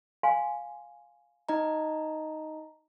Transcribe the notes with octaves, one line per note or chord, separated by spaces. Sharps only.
F5 G#5 C6
D#4 D#5 A#5